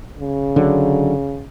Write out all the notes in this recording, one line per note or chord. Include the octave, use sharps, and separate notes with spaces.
C#3
D3 F#3